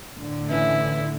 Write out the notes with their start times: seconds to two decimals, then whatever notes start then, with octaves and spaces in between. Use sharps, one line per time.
0.17 A2 D3
0.50 E3 C#4 E4